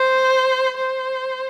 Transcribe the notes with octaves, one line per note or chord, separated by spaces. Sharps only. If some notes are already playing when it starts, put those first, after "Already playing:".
Already playing: C5
C5